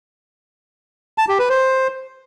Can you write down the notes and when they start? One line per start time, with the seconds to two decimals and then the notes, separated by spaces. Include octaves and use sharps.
1.18 A5
1.28 G4
1.39 B4
1.49 C5